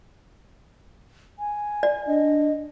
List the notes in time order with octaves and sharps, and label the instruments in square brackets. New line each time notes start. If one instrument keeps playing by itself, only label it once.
[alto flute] G#5
[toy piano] D5
[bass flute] D4 [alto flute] D#5